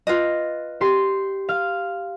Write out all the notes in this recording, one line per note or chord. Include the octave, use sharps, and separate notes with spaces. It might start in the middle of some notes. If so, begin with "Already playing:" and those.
F4 B4 D#5
G4 G5 C6
F5